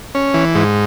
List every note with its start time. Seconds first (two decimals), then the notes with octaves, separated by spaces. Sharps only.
0.15 C#4
0.34 E3
0.55 G#2